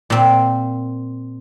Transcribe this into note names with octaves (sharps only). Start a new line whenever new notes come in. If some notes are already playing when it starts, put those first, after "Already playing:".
A#2 C4